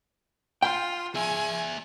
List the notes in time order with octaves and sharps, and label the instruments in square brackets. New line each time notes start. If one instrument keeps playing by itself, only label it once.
[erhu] F4 [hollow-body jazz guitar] G5
[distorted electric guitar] G#4 E5 [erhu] G#5